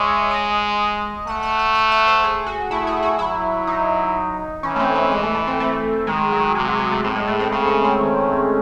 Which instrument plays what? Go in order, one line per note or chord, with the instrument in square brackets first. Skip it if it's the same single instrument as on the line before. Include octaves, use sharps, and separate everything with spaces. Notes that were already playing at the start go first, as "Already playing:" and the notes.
Already playing: [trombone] G#3 [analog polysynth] C#5 D#5 E5
[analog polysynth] D#5
[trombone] A3 [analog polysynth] F#5
[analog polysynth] F#5
F#5
F#5
E5
C5
G#4
F#4
[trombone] A3 [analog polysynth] E4
[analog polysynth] G#4
F#4
[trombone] F#3 [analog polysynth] E4
[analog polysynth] D#4
[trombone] E3 [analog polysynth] C#4
[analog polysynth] A3
C4
A3
G#3
A3
A3
C4
A3
[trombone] D#3 [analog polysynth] G#3
[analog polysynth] F#3
[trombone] C3 [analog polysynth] G#3
[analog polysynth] F#3
G#3
A3
[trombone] A2 [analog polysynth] C4
[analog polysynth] G#3
A3
C4
[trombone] C#3 [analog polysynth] C4
[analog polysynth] C#4
C4
[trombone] D#3